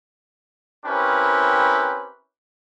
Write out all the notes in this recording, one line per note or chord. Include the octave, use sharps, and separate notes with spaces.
C4 C#4 E4 G4 A#4 B4